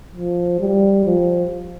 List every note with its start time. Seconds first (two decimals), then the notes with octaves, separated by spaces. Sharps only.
0.15 F3
0.60 G3
1.05 F3